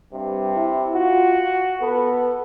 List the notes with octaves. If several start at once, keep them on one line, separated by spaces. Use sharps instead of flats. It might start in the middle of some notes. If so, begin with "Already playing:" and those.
G2 C3
E4
F4 F#4
B3 A4